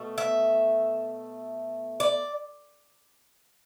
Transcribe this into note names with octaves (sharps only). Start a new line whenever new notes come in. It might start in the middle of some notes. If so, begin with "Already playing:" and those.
Already playing: B2 A3
E5
D5